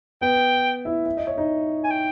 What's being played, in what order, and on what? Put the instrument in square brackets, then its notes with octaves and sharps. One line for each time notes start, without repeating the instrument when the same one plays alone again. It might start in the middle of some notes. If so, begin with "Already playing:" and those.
[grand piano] B3 B4 [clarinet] G5
[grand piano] E4 E5
E5
D#5
C#5
D#4 D#5
[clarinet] G#5
G5